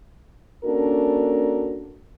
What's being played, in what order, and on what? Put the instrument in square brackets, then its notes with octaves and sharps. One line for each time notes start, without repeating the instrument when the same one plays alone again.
[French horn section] A#3 C#4 D4 F#4 A4 A#4